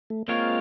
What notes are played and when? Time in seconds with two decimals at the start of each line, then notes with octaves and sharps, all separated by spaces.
0.10 A3
0.28 G#3 A#3 C4 F4 A#4 C#5